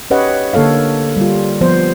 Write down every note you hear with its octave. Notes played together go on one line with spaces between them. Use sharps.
C#4 G4 B4 C#5 D#5 F#5
D3 A#3 A4 C#5 F5
G3 F4
F3 B3 C5